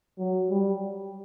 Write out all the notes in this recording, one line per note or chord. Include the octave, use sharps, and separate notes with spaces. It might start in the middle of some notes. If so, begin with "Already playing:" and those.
F#3
G3